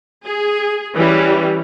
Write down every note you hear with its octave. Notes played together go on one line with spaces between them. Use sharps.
G#4
E3 G3 C#4